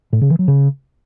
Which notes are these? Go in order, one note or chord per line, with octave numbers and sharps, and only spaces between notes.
A2
C#3
E3
F#3
C#3